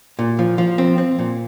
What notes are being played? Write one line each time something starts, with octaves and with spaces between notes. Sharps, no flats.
A#2
F3
F3
C4
C4
A#2